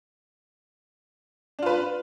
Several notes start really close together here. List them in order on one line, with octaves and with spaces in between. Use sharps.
D4 F4 B4